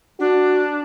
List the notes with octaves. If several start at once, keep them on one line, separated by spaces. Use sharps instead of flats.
D4 F#4